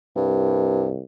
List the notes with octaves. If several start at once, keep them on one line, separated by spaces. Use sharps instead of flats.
C2 G2